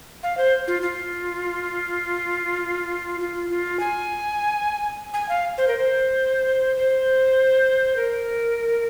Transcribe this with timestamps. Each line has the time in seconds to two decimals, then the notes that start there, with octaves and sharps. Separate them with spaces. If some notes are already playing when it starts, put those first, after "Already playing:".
0.23 F5
0.37 C5
0.68 F4
0.82 F4
3.21 F4
3.50 F4
3.80 G#5
5.14 G#5
5.29 F5
5.58 C5
5.68 A#4
5.77 C5
6.77 C5
7.96 A#4